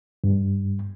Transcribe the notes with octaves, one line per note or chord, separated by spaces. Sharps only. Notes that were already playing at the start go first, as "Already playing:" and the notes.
G2